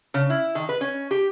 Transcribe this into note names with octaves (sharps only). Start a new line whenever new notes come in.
C#3
E4
D#3
B4
C#4
G4